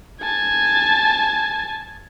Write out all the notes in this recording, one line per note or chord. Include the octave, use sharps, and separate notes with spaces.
G#5 A5